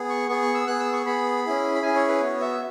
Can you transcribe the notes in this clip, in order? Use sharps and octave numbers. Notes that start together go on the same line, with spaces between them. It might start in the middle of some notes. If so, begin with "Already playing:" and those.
Already playing: B3 G#4
C#6
B3 G#4 C#6
C#6
E6
B3 G#4 F#6
E6
C#6
B3 G#4 B5
C#4 E4 G#4
B5
C#4 E4 G#4 G#5
C#5
B4
B3 F#4 C#5
E5